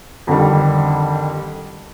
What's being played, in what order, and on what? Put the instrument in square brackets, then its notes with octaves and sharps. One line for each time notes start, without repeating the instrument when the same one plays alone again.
[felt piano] F2 D3 D#3 G3